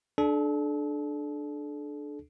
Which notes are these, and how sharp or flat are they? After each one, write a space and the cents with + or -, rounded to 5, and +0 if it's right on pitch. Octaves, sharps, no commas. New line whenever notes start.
D4 +10 A4 -35